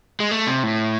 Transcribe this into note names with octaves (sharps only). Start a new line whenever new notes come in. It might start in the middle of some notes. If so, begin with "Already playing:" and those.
G#3
A3
C3
A2